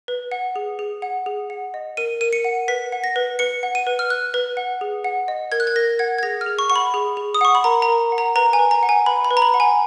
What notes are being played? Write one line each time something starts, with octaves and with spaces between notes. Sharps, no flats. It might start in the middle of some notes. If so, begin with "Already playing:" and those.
B4
F#5
G#4
G#4
F#5
G#4
F#5
D#5
A#4 D#7
A#4 D#7
C#7
F#5
B4 B6
F#5
A#6
B4
B4 C#7
F#5
D#7
B4
F6
B4 F#6
B4
F#5
G#4
F#5
D#5
A#4 G#6
F#6
G#6
A#4 A#6
F#5 G#6
G#6
G#4 A#6
F6
G#4
C#6
F#5 C#6
B5
G#4
G#4
D#6
F#5 C#6
B5
A#4 A#5
A#5
A#4
F#5
A#5
B4 A#5
G#5
B4
A#5
F#5
G#5
B4 B5
B5
B4
A#5
B5
F#5
G#5